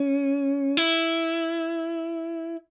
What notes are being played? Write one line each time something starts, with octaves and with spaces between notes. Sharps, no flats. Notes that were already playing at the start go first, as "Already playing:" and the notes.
Already playing: C#4
E4